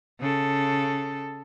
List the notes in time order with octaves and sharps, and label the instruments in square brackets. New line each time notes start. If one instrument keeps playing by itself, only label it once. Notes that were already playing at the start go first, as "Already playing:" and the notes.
[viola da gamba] C#3 A4